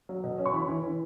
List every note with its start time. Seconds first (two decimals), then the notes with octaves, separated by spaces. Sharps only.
0.09 F#3
0.24 B2
0.38 C#4
0.46 C#6
0.53 E3 B5
0.68 E3
0.83 E3